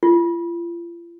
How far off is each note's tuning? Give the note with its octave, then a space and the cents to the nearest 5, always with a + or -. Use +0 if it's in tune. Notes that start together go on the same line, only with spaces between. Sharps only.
F4 -40